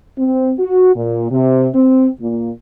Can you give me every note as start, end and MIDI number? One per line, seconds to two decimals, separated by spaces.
0.18 0.53 60
0.59 0.92 66
0.95 1.29 46
1.31 1.68 48
1.75 2.08 60
2.20 2.51 46